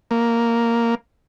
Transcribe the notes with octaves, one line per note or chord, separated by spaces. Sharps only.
A#3